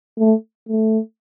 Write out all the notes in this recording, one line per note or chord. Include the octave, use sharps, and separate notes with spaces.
A3
A3